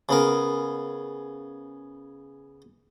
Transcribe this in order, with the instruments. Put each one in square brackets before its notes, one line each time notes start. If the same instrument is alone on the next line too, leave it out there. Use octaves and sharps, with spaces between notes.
[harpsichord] C#3 B3 A#4